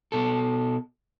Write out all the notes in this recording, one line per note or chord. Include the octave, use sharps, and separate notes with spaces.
B2 A4